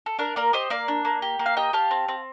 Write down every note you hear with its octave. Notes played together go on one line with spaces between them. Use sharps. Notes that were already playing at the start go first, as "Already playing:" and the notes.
A4
D4 A#4
A#3 A#4 D5
G4 C5 D#5
A#3 D5 F5
D4
A#3
G4
A#3
F5
G4 D#5 G5
G4 F5 A5
C4
C4